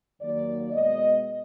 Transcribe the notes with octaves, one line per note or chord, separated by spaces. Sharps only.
D#2 D#3 F#3 A#3 D5
B2 G#3 B3 D#5